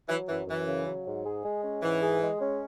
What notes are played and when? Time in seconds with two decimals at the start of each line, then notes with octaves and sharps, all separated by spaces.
0.09 E3 F#3
0.28 F#2 E3
0.47 F#2 E3
0.67 C#3
0.86 F#3
1.06 G#2
1.25 G#4
1.44 G#3
1.64 C#4
1.83 G#2 E3
2.02 G#4
2.22 G#3
2.41 C#4